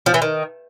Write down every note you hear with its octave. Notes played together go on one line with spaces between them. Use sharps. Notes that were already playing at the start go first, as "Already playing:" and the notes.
F3
E3
D#3